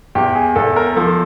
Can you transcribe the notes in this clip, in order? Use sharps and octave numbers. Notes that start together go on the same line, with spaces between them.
E2 G4
G#4
E2 A4
A#4
F3 A4